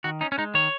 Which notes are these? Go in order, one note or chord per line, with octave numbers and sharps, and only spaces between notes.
D#3 F#4
C#4 D#4
C#4
G#3 D#4
D#3 C#5